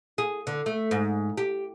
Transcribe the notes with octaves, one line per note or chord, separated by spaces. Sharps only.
G#4
D3
A3
G#2
G4